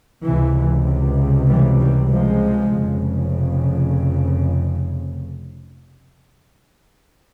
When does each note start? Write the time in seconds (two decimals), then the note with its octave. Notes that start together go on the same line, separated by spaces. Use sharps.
0.24 C#2 C3 E3
1.48 E3 G3
1.79 E3 G3
2.10 F3 G#3
2.73 F1 F2 C#3